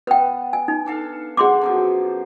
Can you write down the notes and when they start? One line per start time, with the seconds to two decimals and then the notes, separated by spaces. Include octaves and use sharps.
0.07 B3 B4 G5
0.53 G#5
0.68 D#4
0.86 D4 A4 F5
1.37 C4 G#4 F#5 C6 D6
1.61 F#2 B2 F3